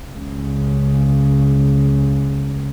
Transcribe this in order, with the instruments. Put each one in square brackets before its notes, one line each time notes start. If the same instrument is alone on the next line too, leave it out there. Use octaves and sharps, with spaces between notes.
[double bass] C#2 C#3